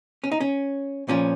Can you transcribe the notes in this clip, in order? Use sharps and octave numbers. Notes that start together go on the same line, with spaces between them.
C#4
D#4
C#4
A#2 F3 C#4